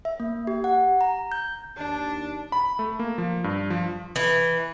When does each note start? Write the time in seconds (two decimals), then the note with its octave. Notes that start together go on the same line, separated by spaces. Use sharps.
0.05 E5
0.20 A#3
0.47 G4
0.64 F#5
1.01 A#5
1.32 G6
1.77 D#2 D4 A5
2.52 B5
2.79 A3
2.99 A#3
3.18 F3
3.44 G2
3.70 F3
4.16 E3